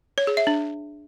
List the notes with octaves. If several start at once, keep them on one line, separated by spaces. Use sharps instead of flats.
C#5
G#4
E5
D4